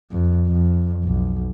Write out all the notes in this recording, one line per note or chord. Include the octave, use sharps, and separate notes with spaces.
F2
F2
B1